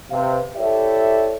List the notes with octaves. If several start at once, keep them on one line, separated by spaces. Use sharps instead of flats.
C3 B4 F5
E4 G4 A4 C#5 D5 E5